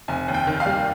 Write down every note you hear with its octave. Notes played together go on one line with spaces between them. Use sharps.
F1 G#5
D#2
G5
D#3
F5
G3